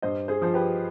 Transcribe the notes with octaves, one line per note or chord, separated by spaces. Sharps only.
G2 C5 D#5
G#4 C5
F3 C5
G4 B4